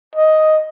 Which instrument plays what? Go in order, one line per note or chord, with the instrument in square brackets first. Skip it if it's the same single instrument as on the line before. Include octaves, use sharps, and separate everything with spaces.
[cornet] D#5